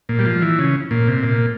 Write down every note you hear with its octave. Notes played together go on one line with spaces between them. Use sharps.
A#2
G3
F3
E3
C#3
A#2
C3
A#2